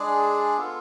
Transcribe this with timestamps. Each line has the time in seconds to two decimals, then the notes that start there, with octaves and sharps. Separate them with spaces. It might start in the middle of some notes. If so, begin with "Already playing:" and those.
Already playing: G#3 D4 G#4 D5
0.57 B3 F4 A4